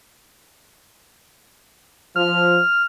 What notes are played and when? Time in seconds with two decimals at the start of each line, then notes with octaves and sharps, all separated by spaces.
2.16 F3 F6